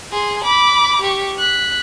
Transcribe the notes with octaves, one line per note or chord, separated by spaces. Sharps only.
G#4 C6
B5 D6
G4 C#6
F#6 B6